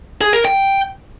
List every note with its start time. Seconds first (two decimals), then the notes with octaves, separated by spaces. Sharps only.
0.21 G#4
0.33 A#4
0.45 G5